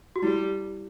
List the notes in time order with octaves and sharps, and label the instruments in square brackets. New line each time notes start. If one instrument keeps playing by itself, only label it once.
[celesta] F#4
[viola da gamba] G3 [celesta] E4